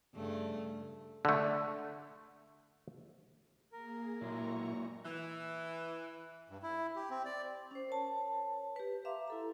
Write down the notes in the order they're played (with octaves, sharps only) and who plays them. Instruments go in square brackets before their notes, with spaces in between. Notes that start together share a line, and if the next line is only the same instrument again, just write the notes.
[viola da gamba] G2 C#3 A3
[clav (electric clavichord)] D3 A3
[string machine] A#3 G#4 [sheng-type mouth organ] A#4
[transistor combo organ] A#2 E4 [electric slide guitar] F#3 G#3 A#3 [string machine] A#5 C#6
[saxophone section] E3
[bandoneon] G2
E4
G4
C4
D5
[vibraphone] C#4 C5
A#4 C#5 A5
G4 B4
E5 F5 A#5 C6 D6
E4 A4 A#5